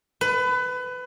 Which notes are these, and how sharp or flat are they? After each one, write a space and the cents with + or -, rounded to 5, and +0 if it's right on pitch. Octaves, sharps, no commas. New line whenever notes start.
B4 +25